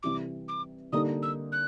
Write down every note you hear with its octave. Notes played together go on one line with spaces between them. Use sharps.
C3 E3 G3 D6
D6
D3 G3 A#3 D#4 D#6
E6
F#6